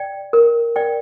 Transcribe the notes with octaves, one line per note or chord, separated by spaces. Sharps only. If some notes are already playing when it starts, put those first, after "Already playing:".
Already playing: D5 G5
A#4
D5 G5